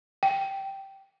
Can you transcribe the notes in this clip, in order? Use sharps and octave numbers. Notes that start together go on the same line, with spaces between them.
G5